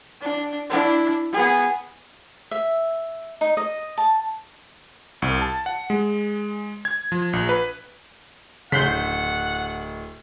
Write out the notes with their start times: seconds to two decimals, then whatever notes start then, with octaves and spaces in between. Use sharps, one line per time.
0.21 D4
0.70 D4 E4
1.33 B3 G#4
2.51 E5
3.41 D#4
3.57 D#5
3.98 A5
5.22 C2
5.42 A5
5.66 F#5
5.90 G#3
6.85 G#6
7.12 F3
7.33 A#1
7.49 B4
8.72 D1 C#3 F#5 C6 G6 B6